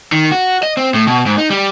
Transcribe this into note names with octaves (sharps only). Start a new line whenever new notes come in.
D#3
F#4
D#5
C4
A2
B2
G#2
D#4
G3